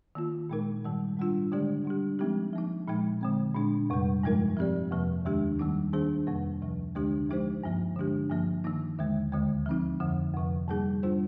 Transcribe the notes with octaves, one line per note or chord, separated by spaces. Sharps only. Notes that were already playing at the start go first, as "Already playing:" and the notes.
D#3 A#3 F4
A#2 G#3 D#4 A#4
G#2 D#3 G3
G#2 G3 D4 F4
D3 G#3 D4 G4 D5
G3 D4 G4
F3 G#3 C4 D#4 G4
F3 A#3 D#4
A#2 F3 G#3 D#4
D3 G#3 C4
A#2 G#3 D4
F2 C3 G3
G2 F3 G#3 D#4 A#4
F3 C4 G4 D5
F2 C3 F3 A#3
D#2 D#3 G#3 D4 G4
D#3 G3 A#3 D#4
D#3 A#3 D4 G#4 C5
F2 C3 G3 A#3
D2 C3 F3
D2 D3 G#3 D4 G4
F3 G#3 D#4 G4 C5
G2 F3 A#3
D3 G#3 D4 G4
G2 F3 A#3
D#3 A#3 D#4
D#2 D3 G#3
D2 D3 G#3
F3 C4 D#4
F2 D3 F3
F2 C3 F3
G#2 G3 A#3 D#4 G#4
G3 D4 F4 C5